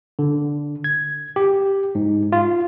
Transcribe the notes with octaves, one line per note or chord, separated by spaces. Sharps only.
D3
G#6
G4
G#2
F4